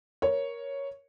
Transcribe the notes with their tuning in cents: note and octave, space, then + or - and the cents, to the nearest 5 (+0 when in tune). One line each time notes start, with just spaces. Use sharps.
A#4 +15 C#5 +0